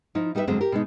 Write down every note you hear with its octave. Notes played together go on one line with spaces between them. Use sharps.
F3 D#4 E4
G3 D#4 F#4 A#4 B4 E5
F2 D3 F#3 G#3 C4
G4 A#4
B2 G#3 D#4